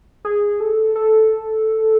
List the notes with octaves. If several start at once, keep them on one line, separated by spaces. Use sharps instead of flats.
G#4
A4
A4